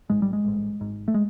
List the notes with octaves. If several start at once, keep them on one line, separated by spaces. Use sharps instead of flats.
A1 G#2 G#3
G3
G#3
A1 G#2
G#1 G#2
A3
G#3